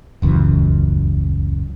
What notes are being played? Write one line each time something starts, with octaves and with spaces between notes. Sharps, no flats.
D#1 C#2 F#2 E3